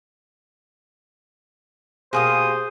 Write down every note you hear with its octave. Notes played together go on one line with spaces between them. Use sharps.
B2 A#3 G4 G#4 C5 D#6